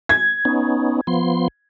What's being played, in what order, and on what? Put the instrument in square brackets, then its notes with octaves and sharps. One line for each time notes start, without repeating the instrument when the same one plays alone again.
[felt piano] G#6
[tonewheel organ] B3 C#4 D#4
F3 B3 C6